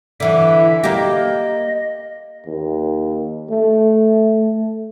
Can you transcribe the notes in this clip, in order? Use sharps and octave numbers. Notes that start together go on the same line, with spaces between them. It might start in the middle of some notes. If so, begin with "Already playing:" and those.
D3 E3 E5
A#3 G4 D#5
D#2
A3